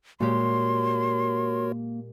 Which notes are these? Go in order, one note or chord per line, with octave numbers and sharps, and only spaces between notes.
A#2 G#3 A#3 F#4 G4 A#4 C#5 C6